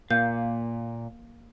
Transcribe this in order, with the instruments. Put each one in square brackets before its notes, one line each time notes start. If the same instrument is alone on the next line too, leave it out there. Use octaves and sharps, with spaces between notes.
[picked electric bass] A#2 [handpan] A#3 [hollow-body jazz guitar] F5 [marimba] G6